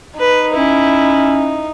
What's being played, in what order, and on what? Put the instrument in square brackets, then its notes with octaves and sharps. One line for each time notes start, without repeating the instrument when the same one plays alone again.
[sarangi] D#4 [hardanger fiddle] B4
[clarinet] C#4 [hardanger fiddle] E4